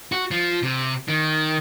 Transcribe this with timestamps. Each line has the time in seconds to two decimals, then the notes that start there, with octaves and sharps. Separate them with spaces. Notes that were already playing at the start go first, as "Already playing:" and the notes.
0.12 F#4
0.31 F3
0.63 C3
1.08 D#3